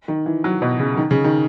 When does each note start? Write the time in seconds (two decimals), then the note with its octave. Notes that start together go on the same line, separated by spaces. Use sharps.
0.08 D#3
0.26 E3
0.44 F#3
0.62 B2
0.79 C#3
0.97 D#3
1.11 C#3
1.24 D#3